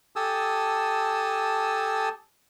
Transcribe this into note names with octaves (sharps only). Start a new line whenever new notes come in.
G4 A4 G#5 A5 D#6 E6